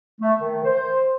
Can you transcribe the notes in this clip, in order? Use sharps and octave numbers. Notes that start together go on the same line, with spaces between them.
A3
D#3
C5